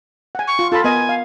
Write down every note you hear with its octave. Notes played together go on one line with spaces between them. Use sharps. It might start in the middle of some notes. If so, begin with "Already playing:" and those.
F#5 G#5
C#6
F4
F4 A4 B5
B3 A#4 D#5 G#5
F5